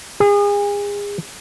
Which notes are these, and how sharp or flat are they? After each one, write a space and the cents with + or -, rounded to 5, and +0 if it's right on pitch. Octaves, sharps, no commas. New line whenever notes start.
G#4 -35